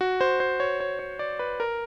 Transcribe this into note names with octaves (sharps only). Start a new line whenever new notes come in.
F#4
C5
C5
C#5
C#5
C#5
D5
B4
A#4